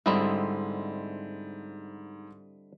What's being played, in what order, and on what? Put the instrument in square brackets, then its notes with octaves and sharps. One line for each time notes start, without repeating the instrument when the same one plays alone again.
[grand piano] G#2 B5 [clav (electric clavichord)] D3 C4 E4 [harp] G3 D#5